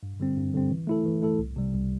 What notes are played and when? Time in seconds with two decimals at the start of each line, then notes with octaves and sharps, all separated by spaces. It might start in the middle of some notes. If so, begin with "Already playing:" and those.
0.03 G2
0.20 D3 G3 C4
0.37 G2
0.54 D3 G3 C4
0.71 E3
0.87 A3 E4 A4
1.05 E3
1.22 A3 E4 A4
1.39 C2
1.56 C3 G3
1.74 C2